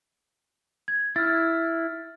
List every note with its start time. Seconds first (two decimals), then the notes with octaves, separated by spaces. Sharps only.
0.88 G#6
1.16 E4 F6 A6